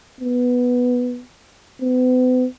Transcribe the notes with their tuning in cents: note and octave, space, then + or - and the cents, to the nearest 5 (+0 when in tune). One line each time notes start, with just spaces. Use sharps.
B3 +0
B3 +40